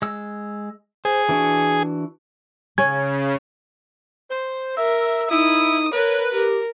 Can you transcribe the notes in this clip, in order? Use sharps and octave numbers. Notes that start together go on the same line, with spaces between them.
G#3 E6
G#4 C5
E3 D4 F#4
C#3 C#4 C#5 G#6
C5
A#4 E5
D#4 E4 D#6
A#4 B4 C#5
G4 A#4